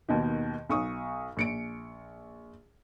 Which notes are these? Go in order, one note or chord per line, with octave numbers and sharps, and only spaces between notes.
D#2 B2 D#3
B1 C#6 D#6
A#1 C#7 D7